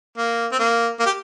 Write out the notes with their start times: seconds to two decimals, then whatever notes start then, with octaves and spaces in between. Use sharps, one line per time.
0.18 A#3
0.52 C4
0.59 A#3
1.00 A#3
1.06 G4